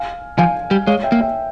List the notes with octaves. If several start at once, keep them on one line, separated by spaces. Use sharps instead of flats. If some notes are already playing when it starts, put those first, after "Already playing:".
Already playing: F5 G#5
F3 F5 G#5
G3
G#3 C#5 F5
E5 G5
A#3
E5 G5